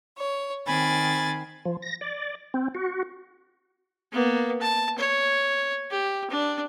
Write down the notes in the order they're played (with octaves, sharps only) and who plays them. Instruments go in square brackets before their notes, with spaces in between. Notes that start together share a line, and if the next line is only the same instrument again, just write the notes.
[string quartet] C#5
D#3 C4 G#5 B5 A6
[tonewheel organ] F3
A#6
D5
C4
F#4
[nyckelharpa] A#3 B3
A5
C#5
G4
D4